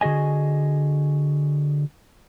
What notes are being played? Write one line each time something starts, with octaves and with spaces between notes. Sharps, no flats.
D3 F#4 G#4 D#5 G#5